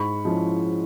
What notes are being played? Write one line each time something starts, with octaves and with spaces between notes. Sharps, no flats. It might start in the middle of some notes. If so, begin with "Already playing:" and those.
Already playing: G#2 B5 C#6
F3 G#3 C#4 E4